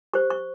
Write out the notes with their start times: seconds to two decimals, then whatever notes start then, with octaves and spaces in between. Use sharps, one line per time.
0.14 G4 C5 C#6
0.30 C#6